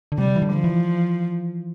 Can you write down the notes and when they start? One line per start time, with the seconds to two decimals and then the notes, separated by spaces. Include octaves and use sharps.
0.12 D3
0.18 C3 G3
0.36 E3
0.42 D3
0.54 F3
0.64 E3